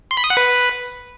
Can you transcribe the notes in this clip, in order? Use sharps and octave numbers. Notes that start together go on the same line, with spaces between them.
C6
B5
D#6
F#5
B4